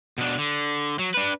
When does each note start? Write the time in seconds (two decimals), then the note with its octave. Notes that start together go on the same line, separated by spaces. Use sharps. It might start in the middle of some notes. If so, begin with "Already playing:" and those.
0.18 B2 D4
0.38 D3
0.99 F#3
1.14 D4 B4